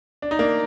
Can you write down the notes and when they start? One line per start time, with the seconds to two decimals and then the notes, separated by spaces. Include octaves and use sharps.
0.22 D4
0.31 D#4
0.39 A#3 D4